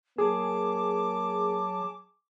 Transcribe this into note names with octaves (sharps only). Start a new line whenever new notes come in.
F#3 A#3 G#4 A5 D6